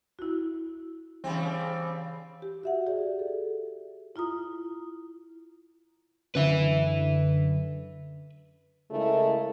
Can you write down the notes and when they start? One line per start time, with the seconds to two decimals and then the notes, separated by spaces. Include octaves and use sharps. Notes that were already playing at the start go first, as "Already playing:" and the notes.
0.19 E4 F#4
1.24 C#3 E3 G3 C4
2.42 G4
2.63 F#4 E5 F#5
2.87 G4 G#4 D5
3.19 A4
4.16 E4 F4 A#5 D#6
6.35 F#2 D3 B4 E5
8.91 C#3 G#3 A3 E4 A4 A#4